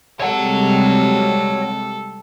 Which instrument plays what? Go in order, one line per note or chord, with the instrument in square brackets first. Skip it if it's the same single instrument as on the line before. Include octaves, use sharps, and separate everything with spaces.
[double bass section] C3 G3 G#3 [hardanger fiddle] A4 [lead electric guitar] C#5 F#5